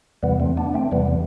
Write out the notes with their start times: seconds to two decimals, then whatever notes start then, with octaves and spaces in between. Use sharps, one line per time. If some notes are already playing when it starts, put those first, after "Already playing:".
0.23 E2 C3 E3 G3 B3
0.40 A3 C4
0.57 B3 D4
0.74 A3 C4
0.91 E2 C3 E3 G3 B3